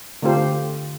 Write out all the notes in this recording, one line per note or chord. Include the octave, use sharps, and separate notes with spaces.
D3 A3 C4 F4 G4 C5